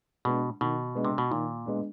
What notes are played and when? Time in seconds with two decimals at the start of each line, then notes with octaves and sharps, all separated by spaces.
0.25 B2 G#3 B3 D4
0.61 B2 D#3
0.95 G#3 B3 D4
1.05 C3
1.18 B2
1.31 A#2 D#3
1.66 G#3 B3 D4